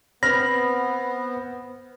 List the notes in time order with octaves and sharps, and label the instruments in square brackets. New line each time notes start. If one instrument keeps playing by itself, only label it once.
[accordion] B3 [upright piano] C4 [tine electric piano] B5 F6 [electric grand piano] A#6